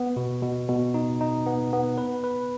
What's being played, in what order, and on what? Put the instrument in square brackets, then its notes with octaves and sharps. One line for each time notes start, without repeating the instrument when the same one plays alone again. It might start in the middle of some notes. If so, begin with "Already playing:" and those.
Already playing: [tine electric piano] B3
B2
B2
B2
D#4
D#4
B3
B3
B4
B4